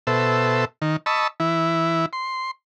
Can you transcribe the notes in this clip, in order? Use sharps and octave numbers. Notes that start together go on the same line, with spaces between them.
B2 A4 C5 E5
D#3
D#5 A5 B5 C#6 E6
E3 E4
C6